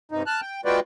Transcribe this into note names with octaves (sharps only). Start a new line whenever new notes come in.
G2 C3 D#4
A5 F6 F#6
G5
G#3 F4 F#4 B4 D5 G5